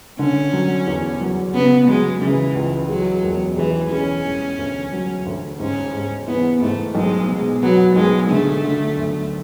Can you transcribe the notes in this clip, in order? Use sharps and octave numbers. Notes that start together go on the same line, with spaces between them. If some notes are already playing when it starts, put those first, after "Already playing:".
D3 C#4
F#3
E2
F#3
C#3 B3
F#3 G#3
C#3 E3
C#2
F#3 G#3
E1
E3 G#3
G#3 C#4
E1
D2
F#3
D2
G#2 C#4
G#2
E3 B3
G#2 A3
B1 G#3
B2
F#3 B3
B1 G#3
D3 A3
D3
D2